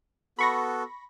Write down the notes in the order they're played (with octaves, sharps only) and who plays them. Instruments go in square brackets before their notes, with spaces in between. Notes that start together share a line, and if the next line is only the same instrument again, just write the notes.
[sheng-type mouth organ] B3 F#4 A4 [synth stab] B5 C#6 A#6